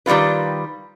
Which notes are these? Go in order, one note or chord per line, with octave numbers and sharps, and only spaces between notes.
D#3 G3 G#3 F4 B4